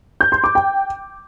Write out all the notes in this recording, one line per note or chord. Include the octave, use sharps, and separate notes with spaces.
G6
C6
D6
G5